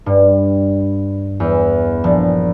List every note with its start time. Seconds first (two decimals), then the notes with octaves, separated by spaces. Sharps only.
0.06 G2
1.40 E2
2.04 A#1